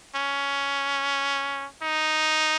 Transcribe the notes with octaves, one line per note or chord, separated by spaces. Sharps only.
C#4
D#4